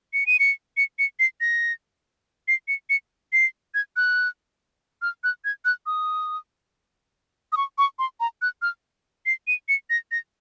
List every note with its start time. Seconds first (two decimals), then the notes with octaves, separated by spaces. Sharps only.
0.13 C#7
0.27 D#7
0.39 C#7
0.77 C#7
0.99 C#7
1.20 C7
1.41 A#6
2.48 C7
2.68 C#7
2.90 C#7
3.33 C7
3.74 G#6
3.96 F#6
5.02 F6
5.24 F#6
5.45 G#6
5.65 F#6
5.86 D#6
7.52 D#6
7.57 C#6
7.78 C#6
7.99 C6
8.20 A#5
8.42 F#6
8.62 F6
9.26 C7
9.47 D#7
9.69 C#7
9.90 A#6
10.12 A#6